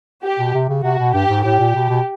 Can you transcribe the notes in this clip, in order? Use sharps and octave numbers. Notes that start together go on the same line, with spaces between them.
G4
B2
C3
C#3
C3 F#4
B2
G2 G4
G#2
A2 G4
A#2
B2
B2